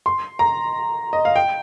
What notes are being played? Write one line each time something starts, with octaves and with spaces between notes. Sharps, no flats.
C6
A#5
D#5
F5
G5